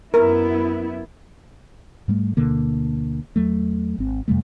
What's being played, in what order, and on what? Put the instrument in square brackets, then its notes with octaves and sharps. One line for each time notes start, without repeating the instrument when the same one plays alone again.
[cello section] F#2 B3 E4 [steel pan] A#4
[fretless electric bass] G#2 G3 A3
D2 B2 D3 A#3
E2 F#3 A3
G#1 C4
F2 C3 G3 A3